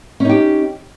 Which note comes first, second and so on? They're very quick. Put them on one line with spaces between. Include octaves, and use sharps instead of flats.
C#4 D#4 G4